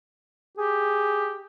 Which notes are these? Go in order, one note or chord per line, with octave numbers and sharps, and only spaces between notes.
G4 G#4